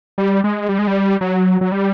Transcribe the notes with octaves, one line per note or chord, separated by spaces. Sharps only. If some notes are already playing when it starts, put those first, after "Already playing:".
G3
G#3
G3
G#3
G3
F#3
F#3
G3